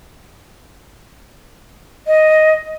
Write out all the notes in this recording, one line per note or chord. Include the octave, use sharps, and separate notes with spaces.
D#5